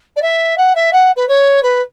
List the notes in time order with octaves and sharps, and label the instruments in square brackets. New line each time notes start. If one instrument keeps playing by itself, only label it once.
[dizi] D5
E5
F#5
E5
F#5
B4
C#5
B4